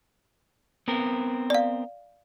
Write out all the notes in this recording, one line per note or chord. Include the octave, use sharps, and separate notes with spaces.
B3 C4 A#4
D5 F5